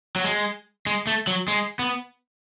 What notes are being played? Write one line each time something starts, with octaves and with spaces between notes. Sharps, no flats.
F#3
G#3
G#3
A3
F#3
G#3
B3